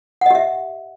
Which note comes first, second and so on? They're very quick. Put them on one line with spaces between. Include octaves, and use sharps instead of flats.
F#5 D#5 G4 E5